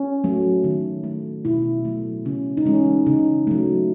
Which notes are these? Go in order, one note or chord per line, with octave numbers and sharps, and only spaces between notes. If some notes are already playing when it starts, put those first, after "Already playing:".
Already playing: C#4
F#3 A3
D#3
A3
B2 E4
F#3 A3
C#3 C#4
D#4
E3 G#3 C#4
C#3 D#4
F#3 A3